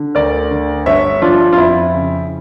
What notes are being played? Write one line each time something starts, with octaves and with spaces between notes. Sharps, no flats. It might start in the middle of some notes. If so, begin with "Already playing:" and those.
Already playing: D3
D2 A#4 D5
D3
G1 C#5 E5
F3 D4 F4
F4
F2 E4
C#3